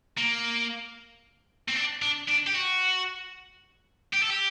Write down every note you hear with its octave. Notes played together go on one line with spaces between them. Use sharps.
A#3
C4
D4
D4
D4
G4
F#4
G4
A4
G4